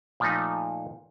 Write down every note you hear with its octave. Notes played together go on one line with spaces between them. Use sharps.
A#2 F3 A3 D#4